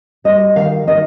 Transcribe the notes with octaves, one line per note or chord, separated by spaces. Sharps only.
G3 D#5
D#3 F5
D#3 D#5